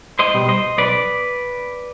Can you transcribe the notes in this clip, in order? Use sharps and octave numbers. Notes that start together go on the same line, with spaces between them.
C5 D#5
B2 G3
C5 D#5
B1 B4 D5